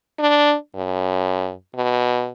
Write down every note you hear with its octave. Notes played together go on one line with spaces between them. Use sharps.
D4
F#2
B2